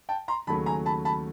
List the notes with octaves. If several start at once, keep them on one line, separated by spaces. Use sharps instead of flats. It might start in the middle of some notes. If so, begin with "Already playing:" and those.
G5 A5
A#5 C6
D#2 C#3 F#3 A3 A5 B5
G#5 A#5
A5 B5
A5 B5